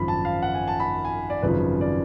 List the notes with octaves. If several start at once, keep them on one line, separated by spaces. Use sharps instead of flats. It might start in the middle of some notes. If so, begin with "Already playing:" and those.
Already playing: G#1 F#2 C#3 F3 B5
A5
F5
F#5
G#5
A5
B5
G#5
D5
G#1 F#2 C#3 F3 B4
D5